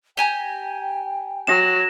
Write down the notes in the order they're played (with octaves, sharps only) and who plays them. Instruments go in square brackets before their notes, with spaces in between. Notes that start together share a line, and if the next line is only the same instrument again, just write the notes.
[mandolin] G4 G#5 A#5 [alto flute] G5
[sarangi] F#3 [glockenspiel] A#6 E7